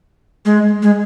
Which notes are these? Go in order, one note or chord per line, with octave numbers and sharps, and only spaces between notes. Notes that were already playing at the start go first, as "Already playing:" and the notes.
G#3
G#3